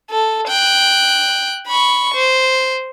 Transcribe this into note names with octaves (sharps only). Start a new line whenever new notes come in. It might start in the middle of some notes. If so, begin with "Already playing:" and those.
A4
G5 F#6
B5 C#6
C5